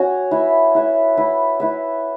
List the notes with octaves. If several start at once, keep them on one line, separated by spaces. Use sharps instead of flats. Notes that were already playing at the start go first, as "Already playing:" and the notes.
Already playing: C#4 F#4 C#5
E4 B4 E5
E4 B4 E5
E4 B4 E5
E4 B4 E5